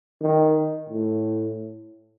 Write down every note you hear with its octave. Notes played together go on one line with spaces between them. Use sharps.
D#3
A2